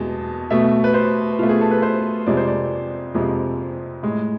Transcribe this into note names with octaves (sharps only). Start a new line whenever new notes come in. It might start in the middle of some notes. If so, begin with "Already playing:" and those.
Already playing: E2 B2 G#3 A5
B2 A3 E5
B4
C5
B2 A3 F4
G#4
A4
B4
C5
F2 C3 F3 G#3 D5
C5
D5
F2 C3 F3 G#3
A2 G#3